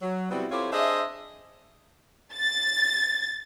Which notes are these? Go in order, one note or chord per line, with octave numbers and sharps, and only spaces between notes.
F#3
C3 G3 B3 C4 E4 F#4
C4 E4 F4 G4 A4 C#5
D4 G#4 C5 D#5 E5
A6